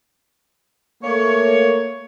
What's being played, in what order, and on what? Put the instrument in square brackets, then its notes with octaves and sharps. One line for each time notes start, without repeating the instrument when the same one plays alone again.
[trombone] A3 [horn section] A#3 C#5